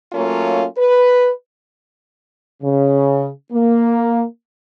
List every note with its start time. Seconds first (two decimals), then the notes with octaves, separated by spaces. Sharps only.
0.13 F#3 A3 A#3 C#4 F4
0.77 B4
2.62 C#3
3.52 A#3